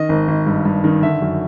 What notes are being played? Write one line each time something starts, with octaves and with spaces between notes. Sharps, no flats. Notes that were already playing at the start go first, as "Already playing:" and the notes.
Already playing: D#3 D#5
G#1
G#1
G2
G2
D#3
D3 E5
F#2